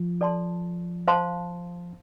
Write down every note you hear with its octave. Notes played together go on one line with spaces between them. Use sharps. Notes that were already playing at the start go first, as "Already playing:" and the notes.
Already playing: F3
A4 D5 A5 C6
C5 F5 A5 C6